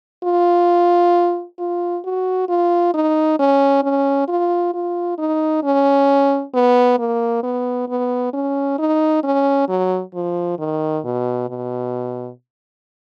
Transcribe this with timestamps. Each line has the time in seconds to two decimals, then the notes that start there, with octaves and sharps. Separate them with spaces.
0.24 F4
1.59 F4
2.04 F#4
2.49 F4
2.94 D#4
3.39 C#4
3.83 C#4
4.28 F4
4.74 F4
5.18 D#4
5.63 C#4
6.54 B3
6.99 A#3
7.43 B3
7.88 B3
8.33 C#4
8.79 D#4
9.24 C#4
9.69 F#3
10.14 F3
10.59 D#3
11.04 B2
11.49 B2